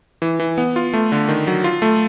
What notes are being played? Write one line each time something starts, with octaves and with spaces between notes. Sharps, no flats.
E3
E3
B3
F4
A3
D3
D#3
F#3
F4
A3